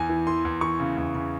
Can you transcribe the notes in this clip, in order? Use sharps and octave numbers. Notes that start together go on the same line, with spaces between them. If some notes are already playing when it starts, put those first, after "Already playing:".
Already playing: E2 G#5
E3
E3 C6
E2
E3 C#6
C#3
E2
C#3